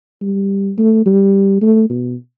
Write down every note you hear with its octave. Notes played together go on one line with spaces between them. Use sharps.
G3
A3
G3
A3
B2